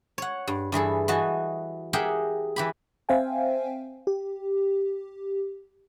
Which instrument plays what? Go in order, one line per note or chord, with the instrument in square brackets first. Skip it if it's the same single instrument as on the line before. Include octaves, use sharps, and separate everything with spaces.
[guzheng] C#5 F#5
G2
G2 E3 G#4 A4
E3 F#4 D#5 A5
G4 G#4 A#4 E5 F#5 G5
E3 G4 B5
[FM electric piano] C4 C5 E5 F5 G5 G#5
G4